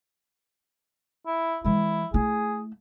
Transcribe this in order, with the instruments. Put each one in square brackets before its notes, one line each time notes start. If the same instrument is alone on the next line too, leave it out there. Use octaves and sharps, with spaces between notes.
[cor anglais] E4
[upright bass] E3 G#3 [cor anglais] E4
[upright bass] A3 E4 [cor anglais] G#4